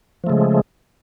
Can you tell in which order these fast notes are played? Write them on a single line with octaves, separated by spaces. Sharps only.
F3 A3 C#3 G#3